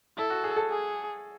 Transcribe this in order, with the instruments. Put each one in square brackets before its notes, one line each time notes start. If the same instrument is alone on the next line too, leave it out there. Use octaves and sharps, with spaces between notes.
[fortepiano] E4 [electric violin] A4
[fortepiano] F#4
G#4
A4
[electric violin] G#4